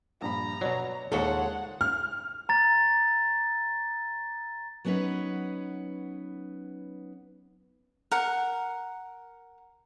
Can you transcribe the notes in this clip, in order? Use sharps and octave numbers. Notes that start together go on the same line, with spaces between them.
A#1 G2 A#5 B5
B2 F#3 C#5 D5
D#2 A#2 G#3 G#4 A4 C5 C#5 F#5
F6
A#5 A6
F#3 B3 C#4 D#4 B4
A#4 F#5